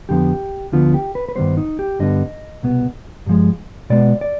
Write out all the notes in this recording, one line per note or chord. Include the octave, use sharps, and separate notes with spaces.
F2 D3 F3 B3 G4
D2 D3 F3 B3 F4
G4
B4
B4
G2 D#3 G3 B3 C5
D#4
G4
G2 D3 G3 B3 D#5
C2 B2 B3
G2 F3 G#3
B2 G#3 B3 D5
D5